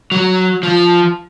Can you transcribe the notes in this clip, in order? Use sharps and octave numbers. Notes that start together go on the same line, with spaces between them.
F#3
F3